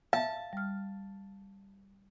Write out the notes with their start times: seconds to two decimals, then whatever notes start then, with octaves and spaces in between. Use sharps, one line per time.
0.13 E5 F5 A5
0.53 G3 F6